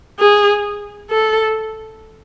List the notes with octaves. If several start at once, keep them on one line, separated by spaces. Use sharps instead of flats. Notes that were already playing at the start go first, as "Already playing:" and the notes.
G#4
A4